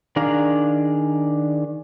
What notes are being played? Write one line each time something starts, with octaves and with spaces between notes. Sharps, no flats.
D#3 D4 G#4 F5 A#5